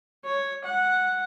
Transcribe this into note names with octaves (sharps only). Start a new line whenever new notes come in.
C#5
F#5